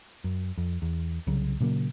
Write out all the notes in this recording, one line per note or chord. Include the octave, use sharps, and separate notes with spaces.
F#2
F2
E2
C2 C#3 F#3
A#2 C#3 F#3 A#3